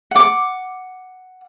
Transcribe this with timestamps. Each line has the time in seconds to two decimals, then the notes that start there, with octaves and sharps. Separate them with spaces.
0.11 F#5 D6